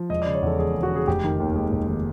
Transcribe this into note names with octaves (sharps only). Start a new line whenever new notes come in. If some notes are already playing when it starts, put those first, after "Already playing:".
Already playing: F3
E1 D#5
D5
C#3
C#5
E2 A4
E1 G#4
E1
F#4
C#3 G#4
F1 G4
D#3
D#2
G#3
F1
D#3